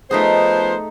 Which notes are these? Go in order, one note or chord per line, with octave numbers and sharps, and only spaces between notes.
F3 A3 B3 D#4 G#4 C5